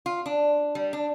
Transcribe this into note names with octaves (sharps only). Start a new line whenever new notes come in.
F4
D4
G3
D4